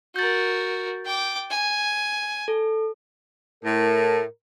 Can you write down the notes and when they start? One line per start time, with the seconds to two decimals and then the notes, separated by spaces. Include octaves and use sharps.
0.16 F#4 A#4 G6 A6
1.05 G5 D6
1.50 G#5
2.48 A4
3.64 A2 A#4